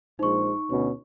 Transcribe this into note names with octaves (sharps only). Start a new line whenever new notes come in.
A#1 G#3 D#4 C5 C#6
D2 B2 C#4